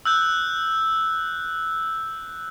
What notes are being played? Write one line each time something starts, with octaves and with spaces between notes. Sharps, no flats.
E6 F#6 G6